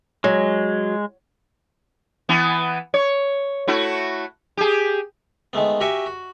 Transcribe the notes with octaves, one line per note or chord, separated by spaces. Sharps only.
F#3 G#3
E3 B3
C#5
A3 E4 F#4
G4 G#4
D#3 G#3 A3 B3
F#4 G4 A#4 E5 G#5 C#6
F#4